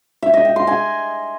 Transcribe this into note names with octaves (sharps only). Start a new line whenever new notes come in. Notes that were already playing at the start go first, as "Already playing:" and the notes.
E5
D#5
G5
C6
G#5